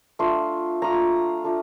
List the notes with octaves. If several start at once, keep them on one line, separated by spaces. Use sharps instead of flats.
A3 D4 F4 C6
A3 D4 F4 A#5
A3 D4 F4